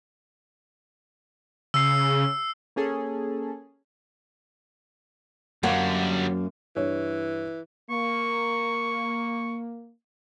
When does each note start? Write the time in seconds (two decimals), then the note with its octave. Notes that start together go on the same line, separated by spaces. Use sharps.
1.74 C#3 E6 C7
2.76 A#3 C#4 G#4 A4
5.63 F#2 D3 F#3 G3 A#3 C#5 F5 F#5
6.76 G2 E3 C#5
7.90 A#3 C#6